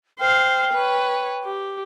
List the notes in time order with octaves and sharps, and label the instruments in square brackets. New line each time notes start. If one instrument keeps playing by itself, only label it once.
[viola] C5 F5 [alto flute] G5
[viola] B4 C#5
G4